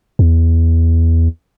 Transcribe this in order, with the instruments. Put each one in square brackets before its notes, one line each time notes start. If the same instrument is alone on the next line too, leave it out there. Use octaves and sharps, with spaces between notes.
[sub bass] E2